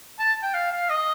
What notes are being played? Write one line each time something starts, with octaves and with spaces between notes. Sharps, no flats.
A5
G5
F5
F5
D#5